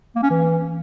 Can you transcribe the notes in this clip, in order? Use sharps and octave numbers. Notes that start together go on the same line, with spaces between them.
A#3
C#4
E3